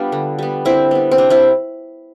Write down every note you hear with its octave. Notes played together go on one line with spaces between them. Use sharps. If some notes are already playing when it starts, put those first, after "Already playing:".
Already playing: G3 B3 D4 F4
D3
G3 B3
D3 C4 E4
G3 B3
C4
C3 D4
C4 E4